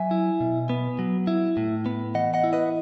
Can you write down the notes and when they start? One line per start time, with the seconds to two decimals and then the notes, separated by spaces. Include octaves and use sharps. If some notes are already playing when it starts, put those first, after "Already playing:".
Already playing: F#3 E5 G#5
0.11 E4
0.40 B2
0.69 B3
0.99 F#3
1.27 E4
1.57 A2
1.86 B3
2.15 E3 D#5 F#5
2.34 D#5 F#5
2.44 E4
2.53 B4 D#5